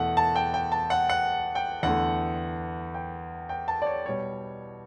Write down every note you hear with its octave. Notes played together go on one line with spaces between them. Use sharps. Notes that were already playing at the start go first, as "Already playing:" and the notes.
Already playing: E2 B2 A3 F#5
A5
G5
G5
A5
F#5
F#5
G5
E2 D3 A3 F#5
G5
G5
A5
D5
C#5
B2 G3 C#5